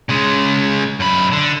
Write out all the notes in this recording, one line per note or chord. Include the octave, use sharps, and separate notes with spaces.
C#3 G#3
F#2 B5
D3